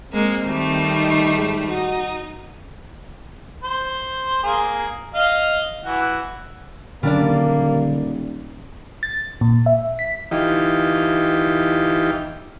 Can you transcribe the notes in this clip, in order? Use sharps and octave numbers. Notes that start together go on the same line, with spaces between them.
G#3 A#3 C4
D#3 G3 A3
D#4
G#2
D#4 F#4
C5
A#3 G#4
D#5 F5
E3 F#4
D#1 B2 D3 F#3 G3 A#3 D4 D5
A6
A#2
E5
B6
E3 D#4 F4 G4